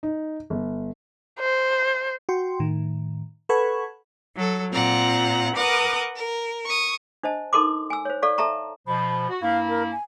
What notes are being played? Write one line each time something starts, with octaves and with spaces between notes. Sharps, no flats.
D#4
G1
C5
F#4 G5 C6
A2 D#3
A4 B4 F#5 B5 C#6 G#6
F#3 A4
A#2 C4 F4 F#5 A#5
A#4 B4 F#5 D6 D#6
A#4
C#6 D#6
D4 C5 D#5 A5
D#4 A4 A#4 C6 D6
G#5 E6
C5 C#5
A4 D5 F5 C#6
A4 E5 A5 A#5 C#6
B2 F3 B5
F#4
G2 A#3 E4 F5
A#4
G#5